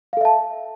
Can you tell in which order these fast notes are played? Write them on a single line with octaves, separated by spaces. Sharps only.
F5 A4 E5 A5